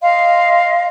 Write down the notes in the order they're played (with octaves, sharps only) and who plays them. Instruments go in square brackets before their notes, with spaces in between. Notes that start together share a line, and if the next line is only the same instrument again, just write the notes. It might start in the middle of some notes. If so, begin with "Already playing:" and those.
[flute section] D#5 F5 C6